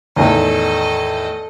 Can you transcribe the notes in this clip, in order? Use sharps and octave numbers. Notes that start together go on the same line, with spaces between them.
E2 A2 D#3 A4 D#5